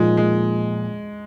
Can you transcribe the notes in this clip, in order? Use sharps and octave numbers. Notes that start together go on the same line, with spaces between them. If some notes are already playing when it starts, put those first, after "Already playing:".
Already playing: A#2 F3 G#3 A#3 D#4
G#3